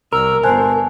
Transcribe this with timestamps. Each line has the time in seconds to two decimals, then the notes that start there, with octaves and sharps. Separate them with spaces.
0.13 C2 A#4 E6
0.44 G1 C5 G#5 A5 F#6